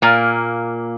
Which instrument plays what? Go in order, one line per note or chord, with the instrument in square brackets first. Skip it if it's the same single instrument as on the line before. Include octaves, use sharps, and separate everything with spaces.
[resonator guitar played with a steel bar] A#2 A#3